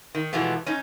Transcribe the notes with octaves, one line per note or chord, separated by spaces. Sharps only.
D#3
B2 E3 F3 G#3 A3 B3
C#4 D#4